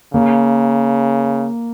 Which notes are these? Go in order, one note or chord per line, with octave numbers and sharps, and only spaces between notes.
C#3 A#3